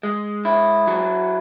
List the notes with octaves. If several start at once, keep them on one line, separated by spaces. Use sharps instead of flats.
G#3
E4
F#3